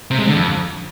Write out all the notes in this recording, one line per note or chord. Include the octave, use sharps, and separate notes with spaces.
C3
G#3
D3
F2